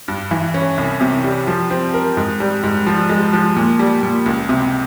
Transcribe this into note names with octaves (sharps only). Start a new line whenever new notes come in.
G2
E3
C#4
C2
C3
G3
F3
C4
A#4
G#2
G3
G#2
F3
G#3
F3
A#2
G3
A#2
C#2
C3